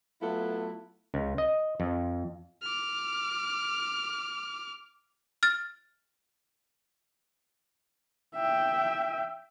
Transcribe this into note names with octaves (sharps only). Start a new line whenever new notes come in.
F#3 A3 B3 E4 F4 A4
C#2
D#5
F2
D6 F6
F6 A6
E5 G5